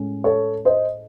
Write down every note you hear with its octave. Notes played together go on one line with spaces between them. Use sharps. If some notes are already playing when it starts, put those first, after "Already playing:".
Already playing: A2 G#3 C#4
A4 C#5
C5 D#5